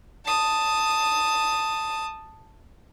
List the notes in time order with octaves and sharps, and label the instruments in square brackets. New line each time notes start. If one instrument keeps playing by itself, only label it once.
[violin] A5 D#6